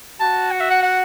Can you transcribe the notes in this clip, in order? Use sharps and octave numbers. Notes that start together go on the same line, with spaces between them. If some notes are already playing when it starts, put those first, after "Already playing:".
F#4 A5
F#5
E5
F#5
F#5